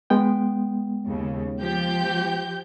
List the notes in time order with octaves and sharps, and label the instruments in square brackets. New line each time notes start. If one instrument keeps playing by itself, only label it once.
[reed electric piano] G#3 B3 G5
[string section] D#2 C#3
F3 G4 G6